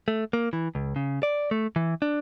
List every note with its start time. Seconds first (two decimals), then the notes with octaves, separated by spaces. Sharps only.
0.08 A3
0.33 A#3
0.53 E3
0.75 C#2
0.96 C#3
1.23 D5
1.51 A3
1.76 E3
2.02 D4